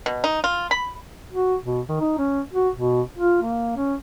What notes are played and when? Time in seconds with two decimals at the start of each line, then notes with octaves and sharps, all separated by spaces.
0.06 B2
0.24 D#4
0.44 F4
0.71 B5
1.32 F#4
1.65 B2
1.88 D#3
2.00 D#4
2.18 C#4
2.53 F#4
2.75 B2
3.18 F4
3.42 A#3
3.76 C#4